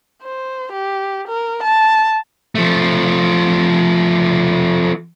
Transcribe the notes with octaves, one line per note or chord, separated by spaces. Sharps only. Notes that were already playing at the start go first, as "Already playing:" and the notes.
C5
G4
A#4
A5
F3 A3